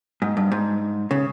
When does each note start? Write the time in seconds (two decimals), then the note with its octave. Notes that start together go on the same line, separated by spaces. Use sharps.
0.22 G#2
0.37 G2
0.52 G#2
1.11 C#3